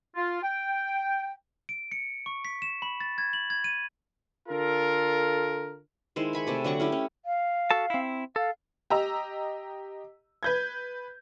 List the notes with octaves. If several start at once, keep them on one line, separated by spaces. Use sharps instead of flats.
F4
G5
D7
C#7
C#6
B6
E7
B5
A6
G#6
F#7
G#6
D#7
D3 F4 A4 A#4
D#3 G#3 E4 C5
G#5 B5 C#6
C3 A3 D5
D3 F#3 F#5 C#6
C#4 E4 G4
C#4
F5
F#4 A4 A5
C4 E4
A4 F5
G4 D#5 A#5 E6
B4 G6 G#6